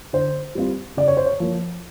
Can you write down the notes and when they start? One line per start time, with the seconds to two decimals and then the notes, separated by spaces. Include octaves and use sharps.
0.13 D3 C5
0.55 G3 C4 F4
0.97 C#3 D5
1.08 C#5
1.17 C5
1.26 C#5
1.40 F3 A#3